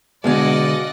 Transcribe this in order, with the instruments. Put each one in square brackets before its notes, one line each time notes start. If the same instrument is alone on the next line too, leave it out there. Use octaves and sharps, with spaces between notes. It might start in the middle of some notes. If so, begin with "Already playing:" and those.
[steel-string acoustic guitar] B2 F5 G#5 [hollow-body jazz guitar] D3 G#3 [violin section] D5 D#5 F#5